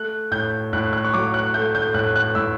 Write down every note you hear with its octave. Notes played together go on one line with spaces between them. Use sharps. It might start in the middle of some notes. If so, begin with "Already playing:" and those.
Already playing: A3 F#6
A2 G6
A2 F#6
F#6
C#6
F#3 D6
F#6
A3 G6
G6
A2 F#6
F#6
A2 E6